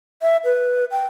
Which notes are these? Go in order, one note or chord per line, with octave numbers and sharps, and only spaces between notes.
E5
B4
G5